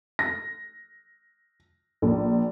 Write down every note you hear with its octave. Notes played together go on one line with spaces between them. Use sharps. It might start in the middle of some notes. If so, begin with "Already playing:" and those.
A#6
A#1